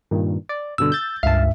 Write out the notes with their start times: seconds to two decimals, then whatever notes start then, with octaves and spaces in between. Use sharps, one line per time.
0.11 G2 A#2 D#3
0.49 D5
0.78 G2 B2 D3 E6
0.92 G6 A6
1.23 C#2 G2 E5 F5 A5